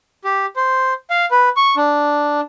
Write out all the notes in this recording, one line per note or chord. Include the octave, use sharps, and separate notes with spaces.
G4
C5
F5
B4
C#6
D4